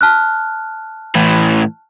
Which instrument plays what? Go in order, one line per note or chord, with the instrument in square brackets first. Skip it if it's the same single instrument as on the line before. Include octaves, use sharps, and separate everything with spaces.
[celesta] A5 F6 F#6
[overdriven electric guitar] A2 E3